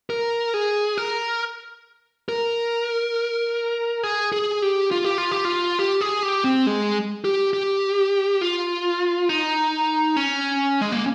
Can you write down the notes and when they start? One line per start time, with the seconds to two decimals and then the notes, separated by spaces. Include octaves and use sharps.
0.10 A#4
0.54 G#4
0.98 A#4
2.29 A#4
4.03 G#4
4.32 G#4
4.62 G4
4.91 F4
5.04 G4
5.18 F4
5.31 G4
5.45 F4
5.79 G4
6.01 G#4
6.23 G4
6.44 C4
6.67 G#3
7.25 G4
7.53 G4
8.41 F4
9.29 D#4
10.16 C#4
10.81 G#3
10.92 A#3